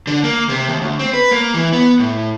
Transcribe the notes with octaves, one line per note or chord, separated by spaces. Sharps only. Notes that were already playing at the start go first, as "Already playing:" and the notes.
D3
A#3
C3
D#2
D2
C4
B4
A#3
E3
B3
A2